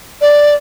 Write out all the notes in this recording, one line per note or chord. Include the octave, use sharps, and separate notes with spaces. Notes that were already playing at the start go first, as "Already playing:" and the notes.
D5